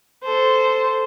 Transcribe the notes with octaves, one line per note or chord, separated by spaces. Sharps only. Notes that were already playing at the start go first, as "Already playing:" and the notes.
A4 C5